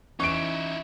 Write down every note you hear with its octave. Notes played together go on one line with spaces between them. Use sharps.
E3 C#4 D#4 E4 C#6 D7